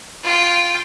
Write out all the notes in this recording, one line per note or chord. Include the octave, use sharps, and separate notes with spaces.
F4 G5